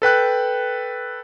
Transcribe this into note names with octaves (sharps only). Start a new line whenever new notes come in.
A4 B4 G5 F#6